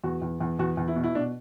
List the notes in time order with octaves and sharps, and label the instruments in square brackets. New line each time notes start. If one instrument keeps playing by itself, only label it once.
[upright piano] E2 F#4
E2
E2
E2 F#4
E2
E4
B2
E4
B2 D4